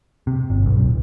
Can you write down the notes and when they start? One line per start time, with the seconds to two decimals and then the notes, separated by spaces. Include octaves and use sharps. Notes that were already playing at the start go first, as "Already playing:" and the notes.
0.27 C3
0.50 G1
0.66 B1
0.80 D1